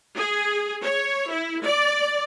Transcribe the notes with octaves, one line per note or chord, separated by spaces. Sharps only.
G#4
C#5
E4
D5